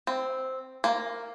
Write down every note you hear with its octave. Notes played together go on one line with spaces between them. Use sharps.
C4
A#3